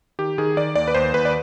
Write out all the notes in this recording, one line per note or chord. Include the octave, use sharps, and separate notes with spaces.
D#3 G4
D#3 G#4
D#3 D5
D#2 D5
B4
D#2 C5
D#2 B4
D5